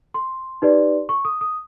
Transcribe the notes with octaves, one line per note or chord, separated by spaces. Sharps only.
C6
D#4 G4 B4 D5
C#6
D#6
D#6